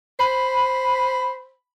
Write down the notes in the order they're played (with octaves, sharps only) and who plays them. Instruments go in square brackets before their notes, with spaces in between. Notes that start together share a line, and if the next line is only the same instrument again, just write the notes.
[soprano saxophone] C5 [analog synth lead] B5